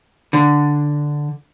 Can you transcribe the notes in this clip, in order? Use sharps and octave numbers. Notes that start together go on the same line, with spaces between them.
D3